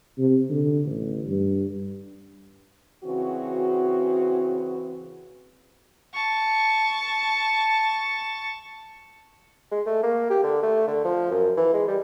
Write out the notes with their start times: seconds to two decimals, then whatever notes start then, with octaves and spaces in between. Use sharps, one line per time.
0.18 C3
0.50 D3
0.85 A1
1.26 G2
3.04 C#3 E3 C4 F#4
6.14 A5 C#6
9.71 G#3
9.86 A3
10.03 A#3
10.30 G4
10.43 D3
10.63 A3
10.87 D3
11.05 F3
11.31 F#2
11.57 E3
11.73 G#3
11.88 G3